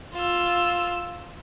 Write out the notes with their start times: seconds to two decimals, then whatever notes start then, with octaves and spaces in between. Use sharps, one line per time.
0.14 F4 E6